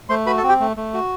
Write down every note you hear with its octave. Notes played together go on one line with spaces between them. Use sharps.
A3 C5 C6
F#4 B4 B5
A4 A5
C4
G4 G5
A3
A3
F#4